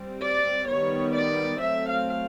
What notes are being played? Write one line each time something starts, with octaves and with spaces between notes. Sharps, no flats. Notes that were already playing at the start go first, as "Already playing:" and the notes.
Already playing: G3 C4
D5
D#3 G3 B3 C#5
D5
F#3 A3 C4 E5
F5